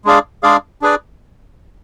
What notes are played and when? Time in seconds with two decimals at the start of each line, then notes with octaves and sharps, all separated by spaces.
0.05 G#3 D4 G#4 D5 F5
0.43 G#3 D4 G#4 D5 F5
0.82 D4 G#4 B4 D5